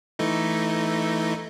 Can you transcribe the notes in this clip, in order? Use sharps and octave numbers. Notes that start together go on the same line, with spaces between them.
E3 A3 D#4